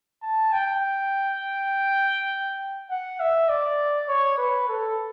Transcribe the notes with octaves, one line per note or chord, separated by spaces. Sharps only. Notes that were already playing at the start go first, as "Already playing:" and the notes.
A5
G5
F#5
E5
D5
C#5
B4
A4